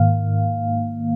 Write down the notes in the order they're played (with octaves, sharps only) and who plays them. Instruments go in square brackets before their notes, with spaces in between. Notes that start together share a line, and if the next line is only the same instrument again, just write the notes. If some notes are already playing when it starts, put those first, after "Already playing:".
Already playing: [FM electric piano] G#2 D#3 A#3 F5